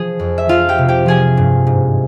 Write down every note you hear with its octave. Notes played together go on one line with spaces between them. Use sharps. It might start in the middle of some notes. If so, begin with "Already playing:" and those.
Already playing: F3 G#4
F2
E5
F3 F4 F5
G4 G5
C3
G4 G5
F3 G#4 G#5
G2
G#2